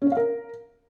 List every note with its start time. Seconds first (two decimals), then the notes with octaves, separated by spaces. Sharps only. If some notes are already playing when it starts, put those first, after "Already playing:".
0.02 C#4
0.07 C#5
0.12 F5
0.17 A#4